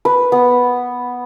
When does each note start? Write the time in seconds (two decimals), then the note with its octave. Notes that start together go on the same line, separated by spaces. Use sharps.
0.05 B4
0.32 B3